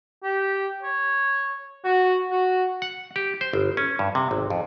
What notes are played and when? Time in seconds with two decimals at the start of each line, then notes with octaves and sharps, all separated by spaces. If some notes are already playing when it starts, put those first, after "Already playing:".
0.23 G4
0.82 C#5
1.85 F#4
2.31 F#4
2.82 F#5
3.16 G4
3.41 C5
3.53 G1
3.77 C#4
3.99 G2
4.15 C3
4.31 G#1
4.50 F2